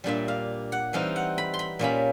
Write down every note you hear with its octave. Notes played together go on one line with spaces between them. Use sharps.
A#2 G3 A#3 D4 E5
F5
F#5
E3 G3 C4 D#4 F5
F#5
B5
C6
B5
A#2 G3 A#3 C#4 B5